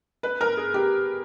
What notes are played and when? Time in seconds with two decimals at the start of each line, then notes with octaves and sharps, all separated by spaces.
0.23 B4
0.41 A#4
0.57 G#4
0.74 G4